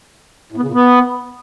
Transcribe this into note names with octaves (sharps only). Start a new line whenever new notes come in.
A2
B3
C#3
A#2
B3